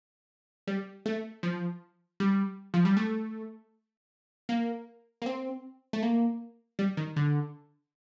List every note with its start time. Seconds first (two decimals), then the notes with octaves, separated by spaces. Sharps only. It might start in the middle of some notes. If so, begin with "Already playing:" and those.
0.67 G3
1.06 A3
1.43 F3
2.20 G3
2.74 F3
2.85 G3
2.97 A3
4.49 A#3
5.22 A#3
5.26 C4
5.93 A3
6.02 A#3
6.79 G3
6.97 D#3
7.16 D3